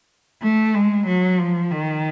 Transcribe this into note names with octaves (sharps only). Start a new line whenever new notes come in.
A3
G#3
F#3
F3
D#3